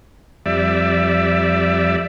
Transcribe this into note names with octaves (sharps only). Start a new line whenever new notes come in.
F2 G3 D5 E5